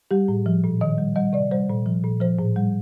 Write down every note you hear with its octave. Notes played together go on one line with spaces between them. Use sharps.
G3 G4
A2
F3
A#2
D#3 D#5
G3
G3 D#5
C3 D5
G3 C5
A#2
F3
A#2
F3 C5
A2
G3